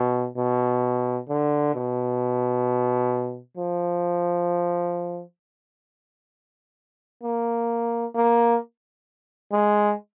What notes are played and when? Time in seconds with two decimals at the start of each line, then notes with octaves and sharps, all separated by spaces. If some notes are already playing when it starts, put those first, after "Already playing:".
Already playing: B2
0.37 B2
1.29 D3
1.74 B2
3.57 F3
7.23 A#3
8.15 A#3
9.52 G#3